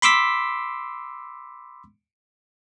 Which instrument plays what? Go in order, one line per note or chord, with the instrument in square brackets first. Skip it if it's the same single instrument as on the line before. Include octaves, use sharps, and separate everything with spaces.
[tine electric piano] B5 C6 D6 E6 B6